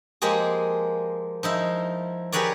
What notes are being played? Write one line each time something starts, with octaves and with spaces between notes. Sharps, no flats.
F3 G#3 A#3 G4 G#4
F3 D#4 E4
G4 G#4 A#4 B4 C#5 D5